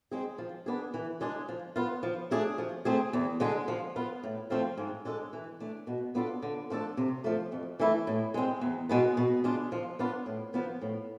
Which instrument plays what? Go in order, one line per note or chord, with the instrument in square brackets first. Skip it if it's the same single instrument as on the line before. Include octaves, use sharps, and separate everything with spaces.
[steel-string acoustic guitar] G#3 C4 G#4
F3
B3 D4 G#4
E3
G#3 D4 G#4
F3
B3 F4
F3
A3 D4 G#4
F3
A3 C4 G#4
E2
D3 G#3 D4 G#4
F3
B3 F4
A2
F3 A3 C4 F4
G#2
G#3 D4 A4
E3
A3 D4
B2
B3 D4 F4 A4
D3
F3 A3 D4 A4
C3
F3 A3
F2
E3 A3 E4
A2
G#3 C4
E2
B2 G#3 B3
B2
G#3 D4 F4
F3
B3 D4 F4
A2
F3 B3
A2